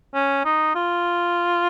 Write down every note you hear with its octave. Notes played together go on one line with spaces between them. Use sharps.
C#4
D#4
F4